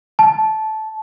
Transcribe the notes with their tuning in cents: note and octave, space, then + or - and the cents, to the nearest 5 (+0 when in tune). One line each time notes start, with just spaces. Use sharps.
A5 -15